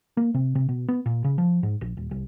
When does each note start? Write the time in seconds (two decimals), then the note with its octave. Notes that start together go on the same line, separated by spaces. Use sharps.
0.17 A#3
0.34 C3
0.55 C3
0.69 B2
0.88 B3
1.06 A#2
1.24 C#3
1.38 F3
1.63 G#2
1.81 A#1
1.97 D#1
2.11 C2